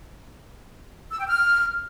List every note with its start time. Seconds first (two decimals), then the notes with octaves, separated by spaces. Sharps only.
1.11 E6
1.20 G5
1.28 F6